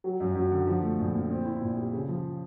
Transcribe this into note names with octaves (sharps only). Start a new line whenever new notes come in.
F#3
F#2
F#2
D3
F3
A3
A#1
A#2
C4
E4
A#2
G3
C#3
F3